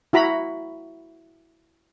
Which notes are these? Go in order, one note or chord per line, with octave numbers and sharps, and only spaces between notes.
E4 F#4 A#5 B5